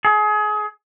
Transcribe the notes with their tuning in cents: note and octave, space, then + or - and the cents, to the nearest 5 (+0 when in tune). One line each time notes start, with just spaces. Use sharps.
G#4 +30